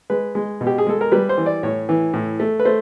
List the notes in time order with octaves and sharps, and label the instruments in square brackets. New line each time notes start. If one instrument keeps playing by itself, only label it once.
[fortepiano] G#3 B4
G#3
B2
G4
G#4
G#3 A4
A#4
G3 B4
C5
E3
D5
A2 C#5
E3
A2
A3
B4
A3 C5